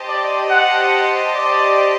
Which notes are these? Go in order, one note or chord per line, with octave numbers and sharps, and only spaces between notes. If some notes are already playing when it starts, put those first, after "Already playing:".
Already playing: G4 C5 D#5 A5
D5
F#5
D5